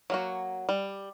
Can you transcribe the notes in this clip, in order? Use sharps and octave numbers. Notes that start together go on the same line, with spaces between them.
F#3 A#3 F#4
G3